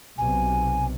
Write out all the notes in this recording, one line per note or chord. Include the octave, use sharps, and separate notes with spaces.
B1 C3 G#5